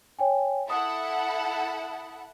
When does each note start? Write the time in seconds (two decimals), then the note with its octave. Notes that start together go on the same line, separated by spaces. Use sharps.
0.19 C#5 G5 G#5
0.70 E4 A4 F#5 D#6